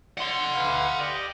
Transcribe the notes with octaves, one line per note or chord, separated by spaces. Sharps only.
F#5 C6
D2 B4 F5
G4 D5 D#5